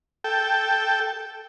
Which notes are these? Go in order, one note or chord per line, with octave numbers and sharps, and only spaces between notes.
A4 G5